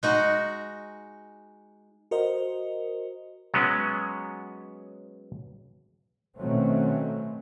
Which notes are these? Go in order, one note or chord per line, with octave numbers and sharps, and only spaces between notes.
G#3 D#4 F#4
F#4 A#4 C5 D#5
F#3 G#3 B3 C#4
B2 D#3 F#3 A3 C4 C#4